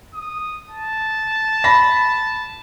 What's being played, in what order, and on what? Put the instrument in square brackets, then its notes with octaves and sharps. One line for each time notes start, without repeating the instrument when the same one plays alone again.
[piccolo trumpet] D#6
A5
[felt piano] B5 A#6